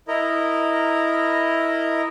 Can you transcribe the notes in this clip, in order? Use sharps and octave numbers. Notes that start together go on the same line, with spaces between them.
E4 A#4 D#5